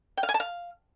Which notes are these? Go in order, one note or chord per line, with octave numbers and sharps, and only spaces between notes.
G5
F5
G#5
A5
F5